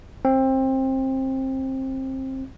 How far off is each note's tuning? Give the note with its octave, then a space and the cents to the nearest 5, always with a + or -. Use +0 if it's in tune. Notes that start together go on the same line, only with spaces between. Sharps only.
C4 +20